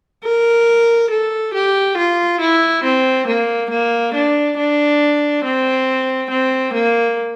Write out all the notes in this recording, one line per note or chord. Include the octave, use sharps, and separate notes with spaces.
A#4
A4
G4
F4
E4
C4
A#3
A#3
D4
D4
C4
C4
A#3